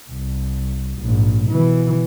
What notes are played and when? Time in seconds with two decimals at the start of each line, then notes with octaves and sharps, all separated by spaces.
0.11 C2
1.00 A#1 G#2
1.47 B2 E3